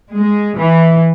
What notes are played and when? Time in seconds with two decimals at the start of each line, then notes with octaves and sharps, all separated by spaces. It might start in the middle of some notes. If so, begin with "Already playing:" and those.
0.14 G#3
0.59 E3